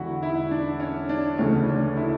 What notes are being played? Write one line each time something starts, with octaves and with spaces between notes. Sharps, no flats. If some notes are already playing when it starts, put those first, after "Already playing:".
Already playing: E1 E2 D3 E4 F#4
E4
D4
C#4
D4
D2 C#3 E3 C#4
D4
E4